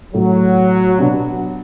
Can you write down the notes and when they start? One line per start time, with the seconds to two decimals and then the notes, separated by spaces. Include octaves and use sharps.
0.14 A2 F#3 A3 F#4
0.98 B2 B3 D4 F#4